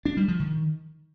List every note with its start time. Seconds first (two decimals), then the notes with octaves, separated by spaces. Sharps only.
0.05 D4
0.17 G3
0.28 F3
0.40 D#3